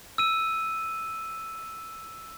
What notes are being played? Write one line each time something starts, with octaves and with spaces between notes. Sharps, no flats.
E6 D#7